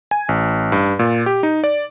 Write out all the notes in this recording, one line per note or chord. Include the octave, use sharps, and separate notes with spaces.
G#5
A1
G2
A#2
G4
D#4
D5